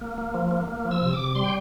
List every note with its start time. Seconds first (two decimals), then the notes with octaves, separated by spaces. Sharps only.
0.01 A#3
0.18 A#3
0.34 F3
0.51 A#3
0.68 A#3
0.85 F3
0.91 E6
1.02 C3
1.13 D6
1.19 C3
1.35 G3 C6
1.44 G5